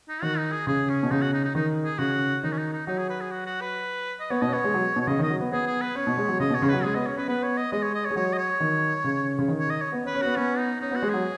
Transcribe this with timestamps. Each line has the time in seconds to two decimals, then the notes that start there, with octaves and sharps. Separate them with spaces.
0.08 D#4
0.22 D#3 F#4
0.38 D#4
0.52 G#4
0.67 C#3 G#4
0.89 C#4
1.03 B2
1.11 C#3 D#4
1.22 F#4
1.33 D#4
1.44 D#4
1.55 D#3 D#4
1.84 G#4
1.99 C#3 F#4
2.43 D#3 D#4
2.52 C#4
2.58 D#4
2.73 D#4
2.87 F#3 D#4
2.98 G#4
3.09 B4
3.21 G#4
3.31 F#4
3.46 F#4
3.61 B4
4.20 D#5
4.30 B3 C#5
4.42 B2 D#5
4.47 C#4
4.53 B3 C#5
4.64 G#3
4.74 F#3
4.96 B2
5.01 C#5
5.07 C#3 D#5
5.19 D#3
5.23 D#5
5.30 F#3
5.40 B3
5.52 B3 G#4
5.67 G#4
5.81 B4
5.95 C#4 C#5
6.07 B2
6.18 G#3
6.28 F#3
6.40 C#3 D#5
6.50 B2
6.55 C#5
6.62 C#3
6.69 F#3 B4
6.83 G#3 G#4
6.95 B3 D#5
7.06 C#4 C#5
7.17 C#4 B4
7.28 B3 B4
7.43 C#5
7.57 D#5
7.72 G#3 D#5
7.82 C#5
7.94 D#5
8.05 C#5
8.10 G#3
8.16 F#3 C#5
8.33 D#5
8.38 C#5
8.60 D#3
9.04 C#3
9.39 C#3
9.48 D#3
9.60 C#5
9.70 D#5
9.81 C#5
9.92 B3
10.04 C#4
10.06 B4
10.15 C#4
10.22 B3 F#4
10.36 B3 C#4
10.58 D#4
10.81 C#4 D#4
10.91 B3
10.95 F#4
11.02 G#3
11.09 F#3 G#4